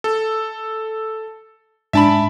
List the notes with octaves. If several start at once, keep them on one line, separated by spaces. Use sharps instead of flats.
A4
G#2 D4 E5 A5 B5